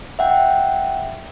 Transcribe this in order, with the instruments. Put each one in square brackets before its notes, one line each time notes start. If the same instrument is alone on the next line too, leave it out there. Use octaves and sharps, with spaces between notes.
[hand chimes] E5 F#5 G5